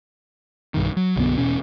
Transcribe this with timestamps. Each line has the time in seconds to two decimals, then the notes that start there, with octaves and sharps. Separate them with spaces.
0.74 B1 G2 D#3
0.97 F#3
1.16 B1 F#2 D3 B3
1.38 E1 B2 C#4